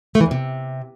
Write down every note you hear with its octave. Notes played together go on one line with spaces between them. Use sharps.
A3
E3
E2
C3